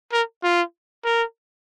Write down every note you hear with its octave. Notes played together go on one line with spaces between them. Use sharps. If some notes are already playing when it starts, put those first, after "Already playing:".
A#4
F4
A#4